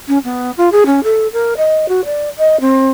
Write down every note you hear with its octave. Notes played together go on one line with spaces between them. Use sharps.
C#4
B3
F4
G#4
C#4
A4
A#4
D#5
F#4
D5
D#5
C4